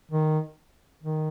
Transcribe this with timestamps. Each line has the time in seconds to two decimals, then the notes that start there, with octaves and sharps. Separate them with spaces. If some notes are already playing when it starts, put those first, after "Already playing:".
0.11 D#3
1.03 D#3